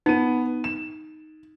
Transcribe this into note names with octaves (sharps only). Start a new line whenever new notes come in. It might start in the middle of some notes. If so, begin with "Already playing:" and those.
B3 D#4 D#7
E7